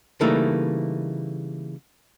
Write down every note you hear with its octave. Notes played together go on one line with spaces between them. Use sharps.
C#3 E3 G3 A3 A#3 D#4